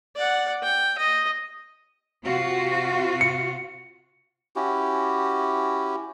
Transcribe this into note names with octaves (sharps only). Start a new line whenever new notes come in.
D5 F#5
G5
D#5
C3 F4 F#4
C#7
C#4 E4 F#4 G4